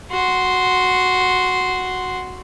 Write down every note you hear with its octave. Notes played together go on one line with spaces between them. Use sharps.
F#4 C6